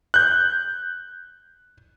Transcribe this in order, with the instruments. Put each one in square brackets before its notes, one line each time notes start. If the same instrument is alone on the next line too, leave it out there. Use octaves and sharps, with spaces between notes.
[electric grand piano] F#6 G6